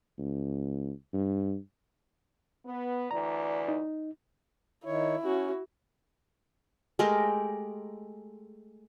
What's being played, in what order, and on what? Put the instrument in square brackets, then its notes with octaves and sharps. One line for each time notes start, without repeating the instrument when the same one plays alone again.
[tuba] C#2
G2
[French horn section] B3
[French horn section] D2 E3 D5 [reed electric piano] A#5
[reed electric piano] D#4
[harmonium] D#3 C#5 [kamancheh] E4
[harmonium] C#4 [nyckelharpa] F#4
[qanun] G#3 A3 G4 A#4